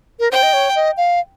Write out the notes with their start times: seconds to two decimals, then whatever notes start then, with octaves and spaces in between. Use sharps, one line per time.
0.20 A#4
0.31 C5 G5
0.43 D#5
0.53 C#5
0.75 D#5
0.97 F5